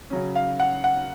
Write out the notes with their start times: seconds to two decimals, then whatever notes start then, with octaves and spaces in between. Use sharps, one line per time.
0.10 C#3 F#3 C#4
0.35 F5
0.60 F#5
0.84 F#5